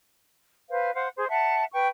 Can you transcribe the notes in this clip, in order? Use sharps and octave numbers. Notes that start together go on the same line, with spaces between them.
B4 C5 F5
C5 F5 F#5
G#4 C5
E5 F#5 A5
B4 G5 C#6